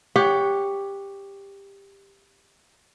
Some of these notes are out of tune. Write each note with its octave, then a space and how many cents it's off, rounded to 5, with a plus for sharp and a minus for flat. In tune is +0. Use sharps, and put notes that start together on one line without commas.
G4 +15 C#5 +20 F#5 -5